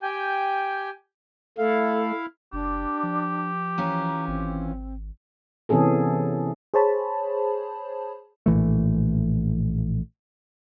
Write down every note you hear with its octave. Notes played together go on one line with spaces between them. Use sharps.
G4 G5 G#5 G6
A3 E4 A4 F5
F#1 D4 G4
F3
E3 C#4 F4 A#5
G#1 C4
C3 E3 B3 C#4 G#4 A4
G#4 C5 C#5 A5 B5
A#1 A2 E3 A3